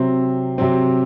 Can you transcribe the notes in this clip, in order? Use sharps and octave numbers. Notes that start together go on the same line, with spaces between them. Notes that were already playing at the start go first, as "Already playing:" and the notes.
Already playing: C3 F#3 C4
C3 F#3 C4